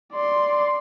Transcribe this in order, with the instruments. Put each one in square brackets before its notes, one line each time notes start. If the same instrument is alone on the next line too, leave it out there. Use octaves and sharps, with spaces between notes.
[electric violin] D5 C6